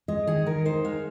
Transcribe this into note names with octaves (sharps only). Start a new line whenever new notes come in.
G#3 D#5
D#3 G#4
D#3 A#4
D#4 C5
G#3 F5